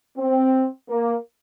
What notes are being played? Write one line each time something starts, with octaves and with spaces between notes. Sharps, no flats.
C4
A#3